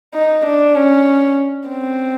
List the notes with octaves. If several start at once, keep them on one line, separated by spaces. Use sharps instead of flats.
D#4
D4
C#4
C4